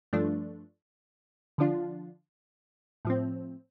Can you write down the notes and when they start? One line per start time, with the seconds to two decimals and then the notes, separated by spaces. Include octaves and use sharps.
0.13 G2 F3 A3 D4
1.58 D3 F3 D4 F4
3.05 A2 F3 C4